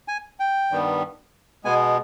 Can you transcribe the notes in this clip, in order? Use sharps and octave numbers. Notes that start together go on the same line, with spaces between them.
G#5
G5
G2 D#3 G3 B3
B2 G#3 B3 G#5